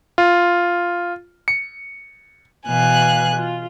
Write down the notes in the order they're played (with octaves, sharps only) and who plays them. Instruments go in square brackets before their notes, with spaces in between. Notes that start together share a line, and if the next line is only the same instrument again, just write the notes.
[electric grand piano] F4
C#7
[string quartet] B2 E3 F5 G#5 F#6
F4